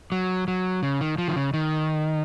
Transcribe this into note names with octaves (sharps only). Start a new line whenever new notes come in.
F#3
F#3
C#3
D#3
F3
D#3
C#3
D#3